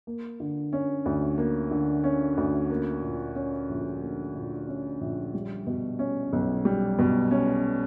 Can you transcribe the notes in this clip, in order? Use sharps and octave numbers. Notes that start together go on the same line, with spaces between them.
A#3
D3
C#4
D2
A#3
D3
C#4
D2
A#3
A#2
C#4
A#1
A#3
A#2
C#4
A#1
G3
B2
C#4
B1
G3
B2
C#4